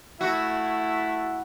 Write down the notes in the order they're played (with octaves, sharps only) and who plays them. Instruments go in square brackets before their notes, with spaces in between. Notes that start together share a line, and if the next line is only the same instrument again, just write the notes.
[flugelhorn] A3 [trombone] E4 [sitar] F#4